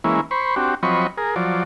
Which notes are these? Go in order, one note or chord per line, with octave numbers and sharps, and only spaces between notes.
E3 G#3 A#3 C#4 E4
C5 B5 C#6
C4 D4 F#4 G4
F3 F#3 C4 D#5 B5 C#6
G#4 A#4
F3 F#3 D5